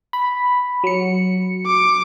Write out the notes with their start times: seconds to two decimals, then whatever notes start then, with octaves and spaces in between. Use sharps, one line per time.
0.13 B5
0.84 F#3 C#7
1.66 D6